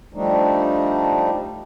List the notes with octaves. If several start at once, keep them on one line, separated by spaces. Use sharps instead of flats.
F3 G3 A3 D4 D#4